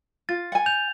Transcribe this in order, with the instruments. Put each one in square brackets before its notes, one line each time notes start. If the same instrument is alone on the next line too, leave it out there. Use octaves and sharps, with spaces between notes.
[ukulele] F4 [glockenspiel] A6
[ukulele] F#5 G#5
[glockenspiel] G6 F7